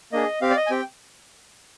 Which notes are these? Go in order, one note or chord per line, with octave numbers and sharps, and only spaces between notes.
A#3 D4 G#4 D#5
C4 G4 F5
D5
D#5
G#5
C4 G4 G5